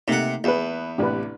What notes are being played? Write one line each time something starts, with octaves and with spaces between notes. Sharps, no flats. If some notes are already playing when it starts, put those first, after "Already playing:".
C3 A3 A#3 D#4 F#5
E2 G#4 B4
A1 C3 D4 G4 B4